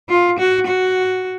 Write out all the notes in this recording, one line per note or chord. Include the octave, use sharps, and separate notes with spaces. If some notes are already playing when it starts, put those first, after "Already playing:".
F4
F#4
F#4